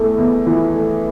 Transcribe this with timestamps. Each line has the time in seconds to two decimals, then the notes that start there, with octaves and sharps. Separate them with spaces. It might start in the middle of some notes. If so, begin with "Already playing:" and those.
Already playing: E2 E3 A3
0.18 E2
0.46 E3
0.75 A3